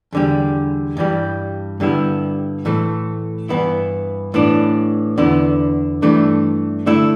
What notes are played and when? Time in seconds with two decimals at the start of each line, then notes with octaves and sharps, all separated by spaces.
0.13 E2 D3 G3
0.97 G2 E3 G3
1.80 G2 D3 G3 B3 E4
2.65 A2 E3 A3
3.49 G2 E3 B3 E4
4.34 A2 E3 B3 D4
5.18 E2 D3 B3 E4
6.02 G2 E3 A3 D4
6.86 D3 A3 E4